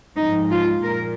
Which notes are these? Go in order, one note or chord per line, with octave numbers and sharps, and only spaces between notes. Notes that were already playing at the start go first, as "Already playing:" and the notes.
G#2 F3 G#3 D#4
F4
A#2 A#4